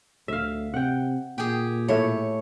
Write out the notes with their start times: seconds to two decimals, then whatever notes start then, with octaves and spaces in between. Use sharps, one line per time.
0.28 D2 E5 F5
0.74 C3 F#5 G5
1.38 A#2 G4 G#4
1.88 A2 A3 C#5